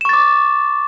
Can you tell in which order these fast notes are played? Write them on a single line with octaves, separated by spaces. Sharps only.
E7 C#6 A6 D6